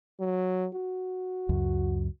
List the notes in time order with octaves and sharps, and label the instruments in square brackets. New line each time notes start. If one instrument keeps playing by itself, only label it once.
[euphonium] F#3
F#4
[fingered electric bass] C#2 F#2